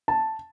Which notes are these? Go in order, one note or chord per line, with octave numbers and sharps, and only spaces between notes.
A5